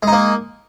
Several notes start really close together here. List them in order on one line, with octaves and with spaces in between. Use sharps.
G#3 D#4 A#3